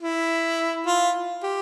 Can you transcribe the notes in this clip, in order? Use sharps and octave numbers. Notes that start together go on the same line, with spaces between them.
E4
F4
G4